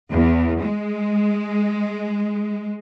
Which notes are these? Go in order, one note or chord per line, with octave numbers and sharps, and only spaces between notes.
E2
G#3